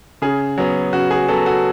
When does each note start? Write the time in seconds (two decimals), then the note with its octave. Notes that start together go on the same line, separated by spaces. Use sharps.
0.22 C#3 G#4
0.58 F#3 B3
0.93 C#3 F#4
1.11 G#4
1.28 F#3 B3 F#4 A4
1.46 F#4 A4